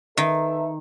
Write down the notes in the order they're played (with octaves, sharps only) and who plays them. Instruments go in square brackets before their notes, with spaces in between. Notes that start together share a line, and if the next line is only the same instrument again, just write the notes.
[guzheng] D#3 [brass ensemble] A4 B4 E5